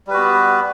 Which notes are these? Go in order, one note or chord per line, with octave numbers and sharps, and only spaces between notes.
G3 B3 F#4 B4